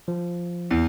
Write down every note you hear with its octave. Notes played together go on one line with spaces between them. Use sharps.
F3
E2